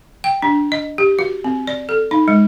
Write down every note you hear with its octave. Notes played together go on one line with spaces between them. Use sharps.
G5
D4
D#5
G4
F#4
C4
D5
A4
D#4
G#3